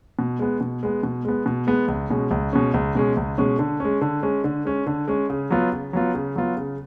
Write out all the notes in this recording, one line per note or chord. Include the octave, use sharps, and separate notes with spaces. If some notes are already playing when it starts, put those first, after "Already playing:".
B2
G#3 B3
B2
G#3 B3
B2
G#3 B3
B2
G#3 B3
C#2
B2 G#3 C#4
C#2
B2 G#3 C#4
C#2
B2 G#3 C#4
C#2
B2 G#3 C#4
D3
G#3 C#4
D3
G#3 C#4
D3
G#3 C#4
D3
G#3 C#4
C#3
F#3 B3 F4
C#3
F#3 B3 F4
C#3
F#3 B3 F4
C#3